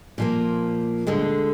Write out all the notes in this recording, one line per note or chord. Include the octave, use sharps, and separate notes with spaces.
A#2 F3 A#3
D2 D3 G#3